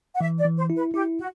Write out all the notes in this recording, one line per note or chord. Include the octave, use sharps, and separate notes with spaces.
F#5
E3 E5
D5
E3
C5
E4
B4
E4 G4
F#4